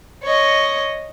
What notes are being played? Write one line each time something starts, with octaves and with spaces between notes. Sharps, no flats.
C#5 D#5